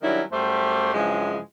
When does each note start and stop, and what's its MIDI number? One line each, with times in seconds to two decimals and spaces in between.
0.02 0.21 51
0.02 0.21 54
0.02 0.21 55
0.02 0.21 61
0.02 0.21 62
0.02 0.21 64
0.31 0.92 42
0.31 0.92 55
0.31 0.92 57
0.31 0.92 67
0.31 0.92 72
0.93 1.38 43
0.93 1.38 49
0.93 1.38 53
0.93 1.38 54
0.93 1.38 56
0.93 1.38 64